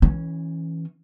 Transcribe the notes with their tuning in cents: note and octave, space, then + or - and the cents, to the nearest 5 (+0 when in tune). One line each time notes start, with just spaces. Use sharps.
E3 -20 C#4 -5